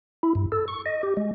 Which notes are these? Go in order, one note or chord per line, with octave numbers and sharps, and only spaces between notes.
E4
G2
A4
C#6
D#5
G4
G#3